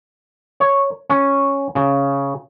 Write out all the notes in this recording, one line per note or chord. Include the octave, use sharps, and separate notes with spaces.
C#5
C#4
C#3